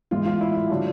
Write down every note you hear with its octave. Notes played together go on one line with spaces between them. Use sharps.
A2 E3 G#3 F4
F4
E4
F4
D3 F#3 A3